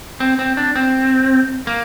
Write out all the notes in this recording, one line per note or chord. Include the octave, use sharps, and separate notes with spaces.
C4
C4
D4
C4
A#3